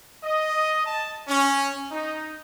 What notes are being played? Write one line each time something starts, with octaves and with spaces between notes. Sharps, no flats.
D#5
A5
C#4
D#4